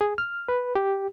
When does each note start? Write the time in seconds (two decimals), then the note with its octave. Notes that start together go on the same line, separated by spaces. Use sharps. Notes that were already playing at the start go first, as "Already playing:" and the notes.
0.01 G#4
0.18 F6
0.49 B4
0.75 G4